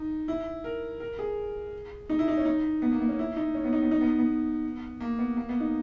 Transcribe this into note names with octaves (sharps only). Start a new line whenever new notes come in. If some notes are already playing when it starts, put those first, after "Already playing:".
Already playing: D#4
E4
A#4
A#4
G#4
D#4
E4
D#4
C#4
D#4
B3
A#3
B3
C#4
E4
D#4
C#4
B3
D#4
B3
D#4
B3
B3
A#3
B3
A#3
B3
D#4